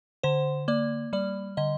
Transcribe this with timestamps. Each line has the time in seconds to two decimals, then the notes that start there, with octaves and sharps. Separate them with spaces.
0.23 D3 C5
0.68 A#3 D5
1.13 G3 D5
1.57 D3 D#5